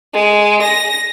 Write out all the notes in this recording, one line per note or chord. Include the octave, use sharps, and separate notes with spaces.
G#3
A#6